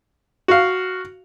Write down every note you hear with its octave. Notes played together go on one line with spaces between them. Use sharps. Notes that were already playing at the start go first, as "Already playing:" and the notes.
F#4 F5